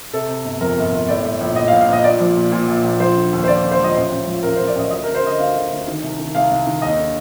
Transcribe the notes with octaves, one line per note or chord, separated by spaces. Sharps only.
C3 A4
C3
G1
F2 A#4
G1
G1
A2 D5
A2
A#1
A#1 D#5
F5
A#1
F5
A#1 D#5
A#2 D5
F3
A#2
A#2
A#1
A#1
F3 C5
D3
D#2
C5
D3 D5
D3
C5
F3 D#5
A1 C5
A1
F3
A1 A#4
C5
A1
D5
A1 D#5
D2 D#5
A#4
D2
C5
D3 D#5
D2 F5
D2
D2
D#3
C2
D#3
C2 F5
C2
D#3
D#2 D#5
D3